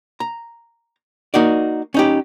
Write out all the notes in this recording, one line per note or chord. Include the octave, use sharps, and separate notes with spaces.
A#5
A#3 D#4 F#4 D5
C#4 D#4 G4